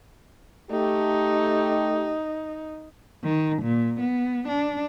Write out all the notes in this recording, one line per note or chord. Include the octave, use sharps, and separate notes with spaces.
A3 D#4 G4
D#3
A#2
B3
D4